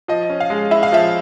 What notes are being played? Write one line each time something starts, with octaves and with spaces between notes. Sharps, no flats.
F3 D#5
C#4
F5
G#3
E4 E5
F5
F3 E5